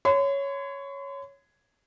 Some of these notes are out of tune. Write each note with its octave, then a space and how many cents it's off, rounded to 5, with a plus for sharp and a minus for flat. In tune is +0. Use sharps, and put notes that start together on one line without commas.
C#5 +0 C6 -45